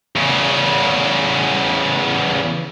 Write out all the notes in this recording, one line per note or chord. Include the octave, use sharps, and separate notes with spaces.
E2 C#3